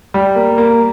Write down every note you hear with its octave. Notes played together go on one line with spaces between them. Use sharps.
G3
A#3
A#3